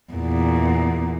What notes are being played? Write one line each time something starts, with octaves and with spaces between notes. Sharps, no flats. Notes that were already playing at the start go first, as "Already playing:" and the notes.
E2 A#2